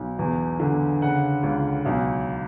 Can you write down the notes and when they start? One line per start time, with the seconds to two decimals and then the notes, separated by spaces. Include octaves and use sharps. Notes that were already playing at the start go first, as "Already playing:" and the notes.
Already playing: B1
0.19 E2
0.60 D3
1.02 C#3 F#5
1.43 C#2
1.85 B1